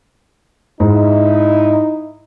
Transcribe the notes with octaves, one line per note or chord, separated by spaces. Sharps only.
G#2 D#4 E4